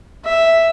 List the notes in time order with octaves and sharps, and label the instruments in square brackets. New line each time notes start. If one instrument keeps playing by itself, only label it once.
[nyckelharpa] E5